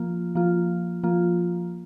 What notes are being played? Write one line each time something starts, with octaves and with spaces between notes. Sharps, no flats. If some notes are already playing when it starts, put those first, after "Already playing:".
Already playing: F3 A#3 F4
F3 A#3 F4
F3 A#3 F4